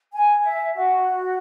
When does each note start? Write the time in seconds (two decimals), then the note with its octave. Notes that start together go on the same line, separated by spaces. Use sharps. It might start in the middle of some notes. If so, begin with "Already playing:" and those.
0.13 G#5
0.44 E5
0.75 F#4